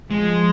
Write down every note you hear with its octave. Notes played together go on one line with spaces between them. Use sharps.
F3 G#3